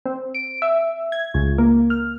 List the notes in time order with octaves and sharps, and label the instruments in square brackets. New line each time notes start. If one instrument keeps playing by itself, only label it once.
[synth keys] C4
D7
E5
G#6
C#2
A#3
F6